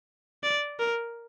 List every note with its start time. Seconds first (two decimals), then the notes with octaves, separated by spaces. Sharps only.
0.43 D5
0.79 A#4